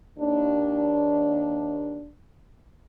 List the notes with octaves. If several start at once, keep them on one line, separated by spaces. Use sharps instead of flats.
D#2 D4